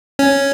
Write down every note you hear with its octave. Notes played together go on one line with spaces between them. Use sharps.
C#4